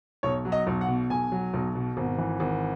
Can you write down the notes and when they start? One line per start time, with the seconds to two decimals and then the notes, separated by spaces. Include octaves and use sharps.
0.23 B1 C#5
0.45 F#3
0.52 D#5
0.67 B1
0.81 F#5
0.88 B2
1.10 B1 G#5
1.32 F#3
1.54 B1
1.75 B2
1.97 G#1
2.18 E3
2.40 G#1